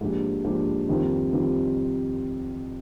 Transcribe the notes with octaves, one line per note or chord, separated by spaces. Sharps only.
G#2 F3 A#3 D4 G4
G#2 F3 A#3 D4 G4
F2 D#3 G3 C4 F4
D#3 G3 C4 F4